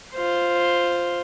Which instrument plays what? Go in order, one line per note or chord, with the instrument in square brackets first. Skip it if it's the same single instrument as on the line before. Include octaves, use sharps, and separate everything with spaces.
[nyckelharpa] F4 C5